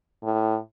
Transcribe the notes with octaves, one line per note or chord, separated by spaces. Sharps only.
A2